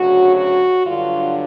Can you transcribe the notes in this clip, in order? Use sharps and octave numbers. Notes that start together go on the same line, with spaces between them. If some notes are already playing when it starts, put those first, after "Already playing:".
Already playing: D2 C#3 F#3 F#4
F#4
G2 D3 F#3 F4